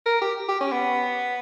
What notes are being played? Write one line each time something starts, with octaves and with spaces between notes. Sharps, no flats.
A#4
G4
G4
C#4
B3